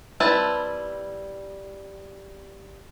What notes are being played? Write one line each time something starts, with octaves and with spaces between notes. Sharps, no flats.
G3 C4 E4 B4 A5